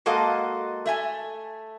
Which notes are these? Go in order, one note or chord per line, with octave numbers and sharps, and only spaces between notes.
G#3 A#3 F#4 A4 D#5 F5
A3 E5 G#5